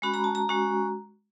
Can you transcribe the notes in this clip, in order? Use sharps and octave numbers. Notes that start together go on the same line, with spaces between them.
G#3 C#4 F#4 B5
A#5
A5
A#5
G#3 C#4 F#4